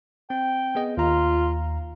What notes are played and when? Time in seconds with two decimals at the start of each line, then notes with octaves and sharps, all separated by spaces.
0.30 C4 G5
0.75 B3 G#4 D#5
0.97 D#2 F4 A#5